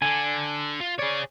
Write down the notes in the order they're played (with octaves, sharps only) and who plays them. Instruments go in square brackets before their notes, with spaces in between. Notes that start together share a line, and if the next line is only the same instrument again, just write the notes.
[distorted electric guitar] D3 D4 [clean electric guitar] G#5
[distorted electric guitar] F4
[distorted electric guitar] G#4 C#5 [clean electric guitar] D5